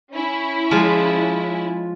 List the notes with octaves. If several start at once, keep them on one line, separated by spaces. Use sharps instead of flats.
C#4 E4
F3 G#3